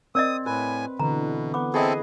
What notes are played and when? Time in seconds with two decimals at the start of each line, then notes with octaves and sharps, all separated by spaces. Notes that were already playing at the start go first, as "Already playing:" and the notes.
0.15 C4 A#4 D5 D#5 D#6
0.46 A2 B4 G#5
0.99 B2 D3 E3 A#5
1.54 B3 D6
1.74 C4 E4 G#4 A4 D#5